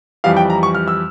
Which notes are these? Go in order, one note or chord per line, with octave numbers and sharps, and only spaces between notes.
F2 E3 G3 F5
G5
A#5
C#6
F6
E6